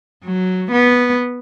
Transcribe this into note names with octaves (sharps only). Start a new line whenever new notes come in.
F#3
B3